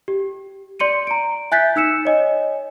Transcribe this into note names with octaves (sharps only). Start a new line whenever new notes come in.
G4
D5 C6 C#7 D#7
A#5 D7
E5 G#5 F#6 G6 A6 B6
D#4 E6 C#7 E7
C#5 D#5 G#5